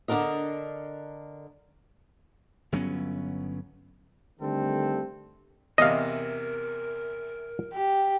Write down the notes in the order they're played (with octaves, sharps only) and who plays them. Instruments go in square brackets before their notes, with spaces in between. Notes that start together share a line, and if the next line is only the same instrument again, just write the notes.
[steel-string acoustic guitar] D3 D4 F#4 A4 A#4 D#5
[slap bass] G1 F#3 B3 C#4
[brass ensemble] D3 D#3 G3 A3 C4 A4
[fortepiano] E2 C3 [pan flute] A#4 [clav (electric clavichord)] D#5 F5
[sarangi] G4